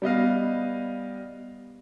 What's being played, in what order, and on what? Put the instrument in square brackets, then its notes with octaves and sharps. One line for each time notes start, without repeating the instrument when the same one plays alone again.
[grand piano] G3 B3 D#5 F5